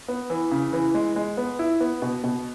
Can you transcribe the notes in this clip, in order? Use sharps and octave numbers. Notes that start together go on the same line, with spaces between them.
B3
E3
C#3
E3
G#3
G#3
B3
E4
B3
B2
B2